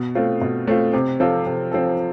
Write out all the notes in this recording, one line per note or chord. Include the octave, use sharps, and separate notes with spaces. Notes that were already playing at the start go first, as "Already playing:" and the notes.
Already playing: B2
A3 C4 F4
B2
A3 C4 F4
C3
F3 C4 F4 A4
C3
F3 C4 F4 A4